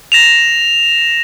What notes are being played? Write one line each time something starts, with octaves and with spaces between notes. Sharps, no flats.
A#6 E7 F7